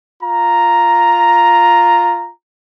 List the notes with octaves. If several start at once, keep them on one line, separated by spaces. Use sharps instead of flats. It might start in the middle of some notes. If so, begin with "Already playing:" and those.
F4 A#5